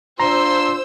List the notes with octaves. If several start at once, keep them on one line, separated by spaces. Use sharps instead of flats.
D4 F4 C5 A#5 C6 E6